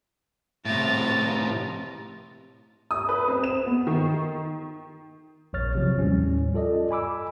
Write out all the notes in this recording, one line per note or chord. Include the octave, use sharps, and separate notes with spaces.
A2 C3 A#5 A6
D#6
B4
C4
E7
B3
D#3
A#1 F2 C#5 F6 A6
C3 F3 F#3
D#2 A2 G3 C#4
F4 A4 D5 D#5
G#5 B5 D6 E6